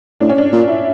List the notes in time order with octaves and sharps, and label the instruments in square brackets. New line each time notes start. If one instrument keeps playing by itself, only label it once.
[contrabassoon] A2 [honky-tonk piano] D4
[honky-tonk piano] C#4
D4
[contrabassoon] A#2
[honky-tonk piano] E4